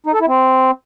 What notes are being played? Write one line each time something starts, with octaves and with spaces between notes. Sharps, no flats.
D#4
A4
E4
C4